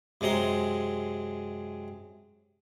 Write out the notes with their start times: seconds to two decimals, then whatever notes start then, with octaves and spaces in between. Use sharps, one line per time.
0.21 F#2 C3 G#3 A#5 C6